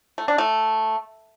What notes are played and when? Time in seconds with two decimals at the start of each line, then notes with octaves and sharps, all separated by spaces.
0.18 A3
0.28 D4
0.38 A3